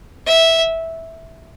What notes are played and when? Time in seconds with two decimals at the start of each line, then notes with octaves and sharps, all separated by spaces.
0.27 E5